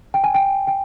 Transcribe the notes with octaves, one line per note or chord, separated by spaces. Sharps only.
G5
G#5
G5
G5